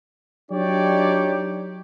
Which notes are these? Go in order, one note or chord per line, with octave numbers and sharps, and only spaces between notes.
F#3 D4 D#4 G4 C#5 D5